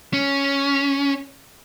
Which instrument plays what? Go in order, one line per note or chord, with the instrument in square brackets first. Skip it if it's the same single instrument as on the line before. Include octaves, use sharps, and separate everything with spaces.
[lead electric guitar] C#4